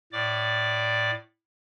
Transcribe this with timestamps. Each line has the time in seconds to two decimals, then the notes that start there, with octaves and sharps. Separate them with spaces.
0.12 A2 D5 D6